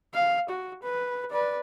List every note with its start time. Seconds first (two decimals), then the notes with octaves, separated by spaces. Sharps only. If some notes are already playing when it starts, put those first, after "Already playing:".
0.14 F5
0.50 F#4
0.83 B4
1.31 B4 D5